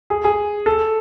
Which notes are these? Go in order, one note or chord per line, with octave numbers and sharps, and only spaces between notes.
G#4
G#4
A4